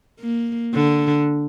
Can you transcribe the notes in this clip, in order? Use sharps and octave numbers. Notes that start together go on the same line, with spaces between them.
A#3
D3